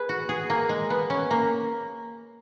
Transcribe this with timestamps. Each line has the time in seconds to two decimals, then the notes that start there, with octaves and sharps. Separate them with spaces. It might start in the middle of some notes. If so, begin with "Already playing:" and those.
Already playing: G#4 B4
0.09 F#4
0.29 G#4
0.50 A#3
0.69 G#3
0.90 B3
1.10 C#4
1.31 A#3